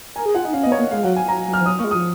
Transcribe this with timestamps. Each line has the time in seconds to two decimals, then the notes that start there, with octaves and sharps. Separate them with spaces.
0.16 A#4 G#5
0.26 G#4
0.35 F4 F#5
0.45 D#4
0.53 C#4 F5
0.63 D#5
0.66 B3
0.72 C#5
0.78 A#3 D#5
0.91 G#3 F5
1.03 F#3 F#5
1.16 G#5
1.28 F#3 A#5
1.48 F#3
1.54 F6
1.61 F3
1.66 F#3 D#6
1.79 A#3 C#6
1.84 G#3
1.91 D#6
1.95 F3